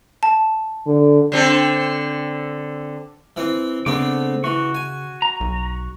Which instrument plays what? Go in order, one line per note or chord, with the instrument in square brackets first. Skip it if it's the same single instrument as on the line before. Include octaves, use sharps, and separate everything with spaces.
[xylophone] A5
[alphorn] D3
[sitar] D3 C4 A4
[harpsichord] E3 C4
[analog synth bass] C#3 [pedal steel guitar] A3 D4 D6 [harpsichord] B3 C4
[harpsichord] E3 [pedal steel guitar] F#4 C#6
[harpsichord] G#5
[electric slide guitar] A#5
[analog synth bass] B1